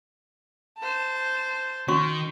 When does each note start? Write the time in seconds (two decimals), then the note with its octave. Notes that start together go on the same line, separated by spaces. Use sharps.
0.78 C5 A5
1.88 D#3 C#4 F#4 C#6